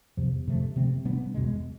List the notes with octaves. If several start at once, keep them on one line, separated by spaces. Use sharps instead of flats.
E2 C3 F3
F2 C3 F3 A3
C3 F3 A3 C4
B2 G3 B3 D4
E2 B2 G#3